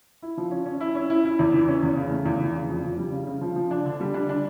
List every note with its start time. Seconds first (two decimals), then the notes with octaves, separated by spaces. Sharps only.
0.22 E4
0.37 F3
0.51 C#4
0.66 C#4
0.81 E4
0.95 C#4
1.10 E4
1.25 E4
1.39 E2
1.54 E3
1.68 C#4
1.83 E2
1.97 C#3
2.11 A3
2.26 E2
2.40 E3
2.54 C#3
2.69 F2
2.84 F2
2.98 G3
3.13 C#3
3.27 C#3
3.41 F3
3.56 F3
3.71 D4
3.85 D3
4.01 G3
4.14 D4
4.29 D4